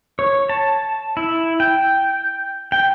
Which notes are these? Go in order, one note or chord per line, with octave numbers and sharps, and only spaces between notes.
C#5
A5
E4
G5
G5